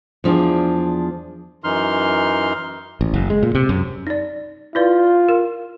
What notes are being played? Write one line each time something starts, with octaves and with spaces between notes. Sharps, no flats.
E2 F3 D4 G#4
F#2 E3 D#4 C6 F6
A1
F#1
G#3
A#2
C3
F#2
D#4 D5
E4 F4 B4 D5
A#4